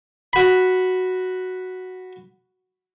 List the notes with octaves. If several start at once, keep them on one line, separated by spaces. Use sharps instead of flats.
F#4 B5